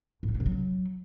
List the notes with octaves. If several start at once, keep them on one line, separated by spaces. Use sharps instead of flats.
A2
F#3
G2
C3
F#3